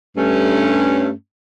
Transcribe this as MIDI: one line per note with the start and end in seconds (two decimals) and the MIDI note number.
0.17 1.10 43
0.17 1.10 57
0.17 1.10 61